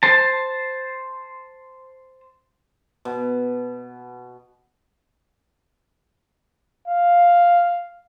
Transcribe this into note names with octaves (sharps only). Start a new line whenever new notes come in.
C5 A5
B2
F5